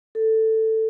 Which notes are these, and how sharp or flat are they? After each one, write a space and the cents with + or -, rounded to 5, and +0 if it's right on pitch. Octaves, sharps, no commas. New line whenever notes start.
A4 +10